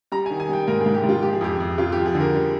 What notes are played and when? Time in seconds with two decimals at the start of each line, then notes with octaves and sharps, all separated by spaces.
0.12 G3 A#5
0.26 G#5
0.31 D#3
0.40 G#5
0.49 G3 G5
0.67 G#2 A#4
0.81 G#4
0.86 G#2
0.94 G4
1.04 G#2
1.09 F4
1.23 F3 G4
1.33 G#4
1.41 F2 G4
1.60 F2
1.78 F2 F4
1.92 G4
1.97 F3
2.06 G#4
2.15 D3
2.20 A#4
2.35 G3